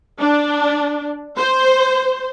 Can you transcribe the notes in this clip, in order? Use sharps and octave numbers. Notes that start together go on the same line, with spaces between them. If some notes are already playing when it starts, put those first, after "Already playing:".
D4
C5